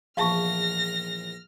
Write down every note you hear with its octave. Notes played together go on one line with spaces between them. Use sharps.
A#1 E2 F5 A5 C#6 F6 A#6